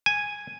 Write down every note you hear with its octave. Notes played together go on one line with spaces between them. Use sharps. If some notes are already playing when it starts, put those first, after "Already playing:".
G#5